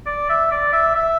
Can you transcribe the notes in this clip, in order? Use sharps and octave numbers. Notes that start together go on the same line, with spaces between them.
D5
E5
D5
E5
E5